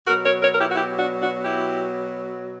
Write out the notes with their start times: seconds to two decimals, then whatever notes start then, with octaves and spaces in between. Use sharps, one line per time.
0.07 B2 F#3 F#4 A#4
0.25 A#4 C#5
0.42 A#4 C#5
0.52 A#4
0.59 E4 G4
0.70 F#4
0.76 E4 G4
0.99 D4 F#4
1.22 D4 F#4
1.44 E4 G4